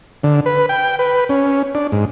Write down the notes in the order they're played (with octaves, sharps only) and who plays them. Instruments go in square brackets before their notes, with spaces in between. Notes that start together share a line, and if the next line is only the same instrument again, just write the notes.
[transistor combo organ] D3
B4
G5
B4
C#4
D4
G#2